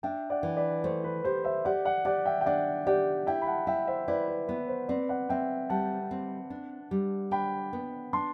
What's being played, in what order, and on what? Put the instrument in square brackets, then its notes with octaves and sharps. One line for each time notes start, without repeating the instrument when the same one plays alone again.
[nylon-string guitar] D4 [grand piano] E5 G5
[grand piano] D5 F#5
[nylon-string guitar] E3
[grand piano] B4 D5
[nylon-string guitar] A3 [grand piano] C5
[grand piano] B4
[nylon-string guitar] G4 [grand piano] C5
[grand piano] C5 E5
[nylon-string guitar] G4 [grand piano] D5 F#5
[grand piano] D5 F#5
[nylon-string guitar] G4 [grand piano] D5 F#5
[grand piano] E5 G5
G5
[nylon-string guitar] D4 [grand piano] D5 F#5
[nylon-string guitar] G4 [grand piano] D5 F#5
[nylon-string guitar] E4 [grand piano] E5 G5
[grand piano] B5
F#5 A5
[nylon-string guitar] E4 [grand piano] E5 G5
[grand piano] C5 E5
[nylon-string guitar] E4 [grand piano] B4 D5
[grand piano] B4
[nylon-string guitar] B3 [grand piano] B4
[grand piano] C5
[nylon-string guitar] C4 [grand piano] B4 D5
[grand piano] D5 F#5
[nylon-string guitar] C4 [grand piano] E5 G5
[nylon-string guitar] G3 [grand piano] F#5 A5
[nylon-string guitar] C4
D4
G3
[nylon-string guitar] D4 [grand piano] G5 B5
[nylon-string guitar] B3
[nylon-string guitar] D4 [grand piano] A5 C6